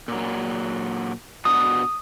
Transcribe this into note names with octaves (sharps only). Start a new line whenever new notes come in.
A#2 F#3
B2 D4 F#4 D#6